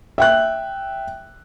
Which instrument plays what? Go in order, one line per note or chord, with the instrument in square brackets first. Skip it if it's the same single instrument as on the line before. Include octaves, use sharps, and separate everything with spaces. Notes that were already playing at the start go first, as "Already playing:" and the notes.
[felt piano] E5 G5 F#6